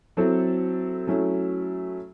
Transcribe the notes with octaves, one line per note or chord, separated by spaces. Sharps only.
F#3 C4 E4 A4
F#3 A3 C#4 E4